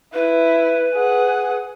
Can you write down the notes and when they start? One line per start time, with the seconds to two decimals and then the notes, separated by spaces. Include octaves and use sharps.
0.14 E4 B4
0.94 G#4 F#5